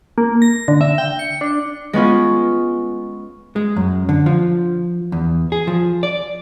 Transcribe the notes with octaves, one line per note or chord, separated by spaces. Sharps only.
A#3
A#6
D3
E5
G5
C#7
D4
G#3 B3 C#4 F4
G#3
F#2
D3
F3
E2
G#4
F3
D5